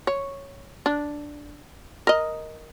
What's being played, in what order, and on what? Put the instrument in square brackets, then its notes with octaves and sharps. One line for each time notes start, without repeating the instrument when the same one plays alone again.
[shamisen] C#5
D4
A#4 D#5